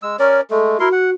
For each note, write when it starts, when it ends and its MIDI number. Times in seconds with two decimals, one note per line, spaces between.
0.03 0.16 56
0.03 0.16 88
0.19 0.41 61
0.19 0.41 70
0.19 0.40 73
0.19 0.41 74
0.51 0.78 56
0.51 0.78 57
0.51 0.80 69
0.80 0.89 64
0.80 1.14 66
0.80 0.89 70
0.80 0.89 84
0.92 1.10 78